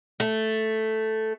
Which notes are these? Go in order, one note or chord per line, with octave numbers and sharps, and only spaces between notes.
A3